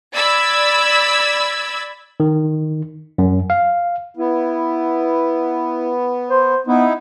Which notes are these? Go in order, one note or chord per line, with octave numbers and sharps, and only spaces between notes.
D5 B5 E6 G#6
D#3
F#2
F5
B3 E4
C5
B3 D#4 E4